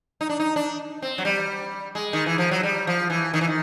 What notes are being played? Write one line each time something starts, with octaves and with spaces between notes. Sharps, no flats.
D#4
D4
D#4
D4
C4
F#3
G3
G#3
D#3
E3
F3
F#3
G3
F3
E3
D#3
E3
D#3